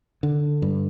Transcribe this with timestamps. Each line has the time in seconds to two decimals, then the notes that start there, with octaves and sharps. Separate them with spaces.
0.23 D3
0.62 G2